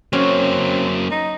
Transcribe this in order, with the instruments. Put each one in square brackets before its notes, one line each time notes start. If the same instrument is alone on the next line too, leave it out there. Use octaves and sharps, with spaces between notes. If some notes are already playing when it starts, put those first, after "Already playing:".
[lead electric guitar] F#3 A#3 [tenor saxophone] C4 [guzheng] C#4
[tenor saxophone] D#4